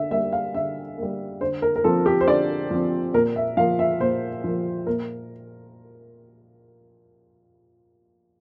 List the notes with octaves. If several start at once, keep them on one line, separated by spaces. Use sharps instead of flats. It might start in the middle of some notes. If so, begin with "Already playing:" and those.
Already playing: D3 E5
G3 A#3 E5
F5
D3 E5
G3 A#3
D3 C5
A#4
A#4
F3 C4 A4
G4
C5
D3 D5
F3 C4
A#2 A#4
E5
F3 A#3 F5
E5
A#2 C5
F3 A#3
A#2 A#4